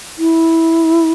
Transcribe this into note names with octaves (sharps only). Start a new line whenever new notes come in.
E4